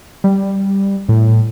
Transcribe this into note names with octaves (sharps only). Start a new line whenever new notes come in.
G3
A2